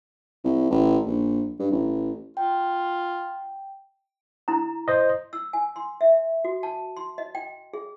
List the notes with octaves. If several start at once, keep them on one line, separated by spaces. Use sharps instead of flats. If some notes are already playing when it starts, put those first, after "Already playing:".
C2
A1
A#1
G2
A1
F4 G5
E4 A#5
C5 D#5
E6
G#5
C6
E5
F#4
A5
C6
D#5
G5
G#4